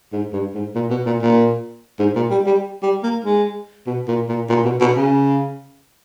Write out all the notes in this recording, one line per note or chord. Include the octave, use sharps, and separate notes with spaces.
G#2
G2
G#2
A#2
B2
A#2
A#2
G#2
A#2
G3
G3
G3
A#3
G#3
B2
A#2
A#2
A#2
B2
B2
C#3